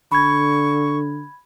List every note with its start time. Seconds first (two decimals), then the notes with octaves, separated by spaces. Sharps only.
0.12 D3 B5 C#6 G#6